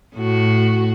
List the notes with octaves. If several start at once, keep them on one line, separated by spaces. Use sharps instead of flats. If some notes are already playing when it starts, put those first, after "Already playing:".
A2 F#4